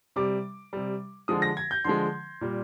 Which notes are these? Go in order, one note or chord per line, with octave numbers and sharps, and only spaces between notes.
C3 G3 D6
C3 G3
D3 F3 G#3 D#6
A#6
G#6
G6
D3 F3 G#3 C6
A#2 G3